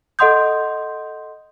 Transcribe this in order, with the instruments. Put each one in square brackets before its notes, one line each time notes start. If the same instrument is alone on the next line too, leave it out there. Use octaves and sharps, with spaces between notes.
[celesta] A4 D#5 F#5 C6 D#6 G6